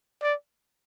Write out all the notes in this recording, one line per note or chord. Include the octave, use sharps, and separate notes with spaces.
D5